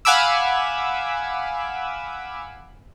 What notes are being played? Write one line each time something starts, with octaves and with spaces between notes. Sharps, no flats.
F5 F#5 G#5 B5 D6 E6